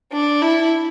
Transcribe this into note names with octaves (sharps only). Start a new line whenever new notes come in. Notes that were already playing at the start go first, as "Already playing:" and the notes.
D4
E4